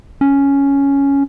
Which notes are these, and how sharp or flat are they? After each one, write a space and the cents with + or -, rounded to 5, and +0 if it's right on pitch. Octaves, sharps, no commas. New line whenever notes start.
C#4 +5